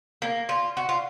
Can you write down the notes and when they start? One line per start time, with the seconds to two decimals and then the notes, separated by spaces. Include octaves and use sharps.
0.22 A#3
0.49 F4
0.77 F#4
0.89 F4